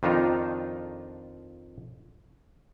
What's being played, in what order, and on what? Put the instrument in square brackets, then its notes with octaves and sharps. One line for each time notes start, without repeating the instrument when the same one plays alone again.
[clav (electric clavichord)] F2 D#3 D4 D#4 F4